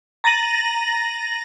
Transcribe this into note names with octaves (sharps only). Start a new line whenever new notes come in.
A#5 A6 A#6 D#7 F#7